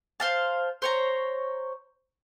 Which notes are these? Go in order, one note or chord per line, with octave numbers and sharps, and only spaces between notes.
C5 F5 A5
C5 C#5 A#5